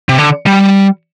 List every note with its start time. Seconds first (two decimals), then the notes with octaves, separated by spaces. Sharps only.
0.09 C3
0.18 D3
0.47 G3